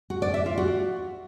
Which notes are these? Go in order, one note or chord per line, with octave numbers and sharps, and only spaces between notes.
F#4
D5
E5
F4
F#4